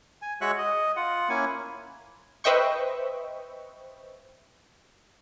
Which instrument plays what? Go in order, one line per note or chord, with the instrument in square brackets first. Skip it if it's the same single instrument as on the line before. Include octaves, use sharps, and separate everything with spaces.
[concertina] G#5
G#3 F#4 C#5 E5 C#6 F#6
D#5
F4 F#5
A#3 C#4 E4 G#5
[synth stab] B4 C5 D#5 E5 G5 C#6